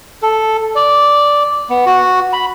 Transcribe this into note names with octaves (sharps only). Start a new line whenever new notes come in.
A4
D5
B3
F#4
B5